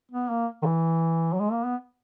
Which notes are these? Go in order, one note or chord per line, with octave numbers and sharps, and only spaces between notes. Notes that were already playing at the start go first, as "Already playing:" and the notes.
B3
A#3
D#3
E3
F#3
G#3
A#3
B3